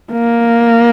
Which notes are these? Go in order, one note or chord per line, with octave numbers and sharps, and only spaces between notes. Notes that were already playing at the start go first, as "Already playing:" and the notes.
A#3